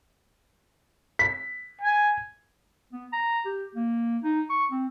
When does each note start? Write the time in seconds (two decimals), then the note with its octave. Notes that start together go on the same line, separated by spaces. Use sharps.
1.19 B6
1.81 G#5
2.92 B3
3.13 A#5
3.45 G4
3.75 A#3
4.23 D#4
4.50 C#6
4.72 C4